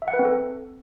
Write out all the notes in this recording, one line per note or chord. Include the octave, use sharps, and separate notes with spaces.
E5
F#5
B4
C4
A4